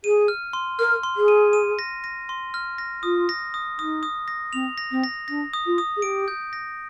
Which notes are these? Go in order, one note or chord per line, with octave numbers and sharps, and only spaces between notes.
G#4 D#7
F6
C6
A#4 F6
C6
G#4
D#7
D#7
A#6
A#6
C6
F6
A#6
F4 D#6
A#6
D#6
D#4 D#6
D#6
A#6
C4 F7
A#6
C4
A#6
D4 A#6
D#6
F4
D#6
G#4
G4 D7
G6
A#6